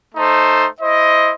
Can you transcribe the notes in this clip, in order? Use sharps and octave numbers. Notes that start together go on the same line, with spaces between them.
A3 D#4 A4 C5
E4 C5 D#5